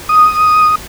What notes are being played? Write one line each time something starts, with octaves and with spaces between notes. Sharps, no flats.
D#6